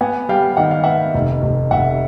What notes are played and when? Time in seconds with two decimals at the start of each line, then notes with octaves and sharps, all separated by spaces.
0.01 B3 F#5 G#5
0.29 G3 F5 G5
0.57 D#3 F#5
0.71 F5
0.84 B3 E5 F#5
1.14 F1
1.43 F1
1.71 F1 E5 F#5